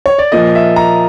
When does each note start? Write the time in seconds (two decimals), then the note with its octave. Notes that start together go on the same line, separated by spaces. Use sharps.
0.06 C#5
0.19 D5
0.32 A#2 F3 A#3 D#5
0.55 E5
0.76 A#5